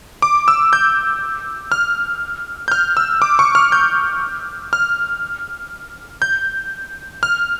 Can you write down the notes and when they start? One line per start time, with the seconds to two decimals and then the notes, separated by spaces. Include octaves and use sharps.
0.22 D6
0.48 E6
0.73 G6
1.72 F6
2.68 G6
2.72 F6
2.97 E6
3.22 D6
3.39 C#6
3.55 F6
3.72 G6
4.73 F6
6.22 G6
7.23 F6